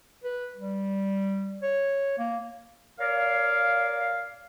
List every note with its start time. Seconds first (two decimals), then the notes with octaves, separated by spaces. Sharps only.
0.24 B4
0.56 G3
1.62 C#5
2.18 A#3
3.00 A#4 C#5 D5 F5